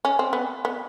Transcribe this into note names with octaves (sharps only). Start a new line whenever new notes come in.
C#4
C4
B3
B3